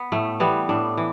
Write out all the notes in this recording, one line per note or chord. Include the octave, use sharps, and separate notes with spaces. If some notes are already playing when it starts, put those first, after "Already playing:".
Already playing: B3
A2 A3
E3 G3 B3
A2 D4
E3